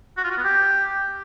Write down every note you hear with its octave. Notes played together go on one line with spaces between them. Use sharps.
F#4
F4
F#4
B3
G4